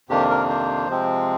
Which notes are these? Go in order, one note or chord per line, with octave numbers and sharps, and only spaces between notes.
F2 C3 D#3 A#3 D4 G4
A#4
C5
C3 F3 G#3 C4